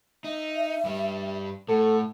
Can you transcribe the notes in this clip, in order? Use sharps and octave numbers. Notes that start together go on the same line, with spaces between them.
D#4 E5
G2 G3
A2 A4 F#5